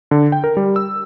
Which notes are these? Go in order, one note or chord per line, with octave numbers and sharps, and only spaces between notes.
D3
G5
A#4
G3
E6